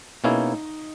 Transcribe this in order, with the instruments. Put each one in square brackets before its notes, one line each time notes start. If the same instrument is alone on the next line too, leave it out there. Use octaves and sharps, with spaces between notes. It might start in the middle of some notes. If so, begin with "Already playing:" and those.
[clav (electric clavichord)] B2 A#3 C#4 E4 G#4 [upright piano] D#4